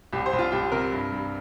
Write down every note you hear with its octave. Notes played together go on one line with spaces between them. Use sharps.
C2 G4
C5
C2
F4
C2 G4
C3 A#4
G2
G2